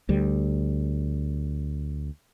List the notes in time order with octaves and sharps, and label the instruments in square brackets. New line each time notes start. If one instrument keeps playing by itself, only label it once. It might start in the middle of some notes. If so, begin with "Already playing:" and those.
[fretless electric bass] D2 G3